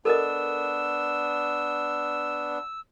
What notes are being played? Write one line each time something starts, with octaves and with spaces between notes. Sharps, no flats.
B3 D4 A4 A#4 D#5 E6